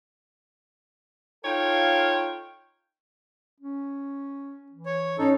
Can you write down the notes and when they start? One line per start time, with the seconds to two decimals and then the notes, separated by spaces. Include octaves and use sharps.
1.43 D#4 F4 A4 C#5 F5 G5
3.61 C#4
4.71 E3
4.86 C#5
5.18 G#2 C#4 D#4 A4